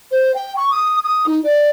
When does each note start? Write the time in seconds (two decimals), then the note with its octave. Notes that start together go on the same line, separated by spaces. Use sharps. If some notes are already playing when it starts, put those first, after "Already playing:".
0.11 C5
0.34 G5
0.57 C#6
0.71 D#6
1.04 D#6
1.26 D#4
1.44 D5